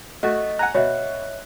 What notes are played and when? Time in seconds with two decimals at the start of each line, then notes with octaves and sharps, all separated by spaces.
0.23 A3 F#4 D#5
0.59 F#5 G#5 A#5 F#6
0.75 B2 C#5 D#5 E5